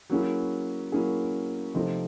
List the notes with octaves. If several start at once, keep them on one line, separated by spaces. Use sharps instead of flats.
F#3 A#3 C#4 E4 G#4
F#3 A#3 C#4 E4 G#4
C3 F3 A3 C4 D#4